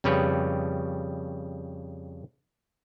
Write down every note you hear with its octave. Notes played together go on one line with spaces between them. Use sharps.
F2 C#3 G3 B4 C#5